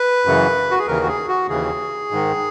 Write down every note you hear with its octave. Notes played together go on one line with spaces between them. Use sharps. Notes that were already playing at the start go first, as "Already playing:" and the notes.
Already playing: B4
F#2 C#3 E3
F#4
G#4
D#2 C#3 E3 A#4
F#4
G#4
F#4
D#2 C#3 E3 G#4
G#2 D#3